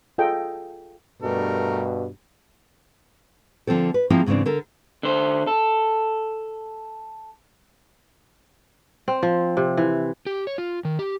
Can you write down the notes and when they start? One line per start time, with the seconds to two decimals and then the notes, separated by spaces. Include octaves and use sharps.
0.18 F4 G#4 A4 D#5 G5
1.22 G2 B2 G3 A3 A#4
3.67 D3 F3 A#3 C4 A4
3.94 B4
4.10 F3 A#3 C4 E4 F4 G#4
4.26 G#2 C#3 E3 C4 D4
4.46 D3 A4 A#4
5.03 D3 C5
5.47 A4
9.08 C4
9.23 F3
9.57 C3
9.77 E3
10.26 G4
10.47 C#5
10.58 F4
10.85 D#3
10.99 G4